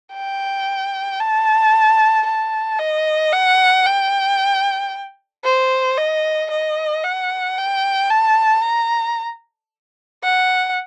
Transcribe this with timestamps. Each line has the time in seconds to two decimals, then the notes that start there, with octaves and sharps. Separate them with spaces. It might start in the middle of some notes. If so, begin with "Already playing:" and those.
0.13 G5
1.20 A5
2.27 A5
2.79 D#5
3.32 F#5
3.85 G5
5.45 C5
5.97 D#5
6.51 D#5
7.04 F#5
7.58 G5
8.10 A5
8.64 A#5
10.23 F#5